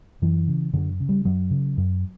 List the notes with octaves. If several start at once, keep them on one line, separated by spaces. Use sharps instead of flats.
F#2 E3
C#3
F#2 D3
C#3
G3
F#2 F#3
C#3
F#2